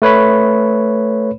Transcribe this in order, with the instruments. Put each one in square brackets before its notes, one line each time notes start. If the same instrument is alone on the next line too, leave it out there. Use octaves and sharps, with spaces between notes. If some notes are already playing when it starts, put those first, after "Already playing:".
[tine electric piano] A3 B4 C#5 B5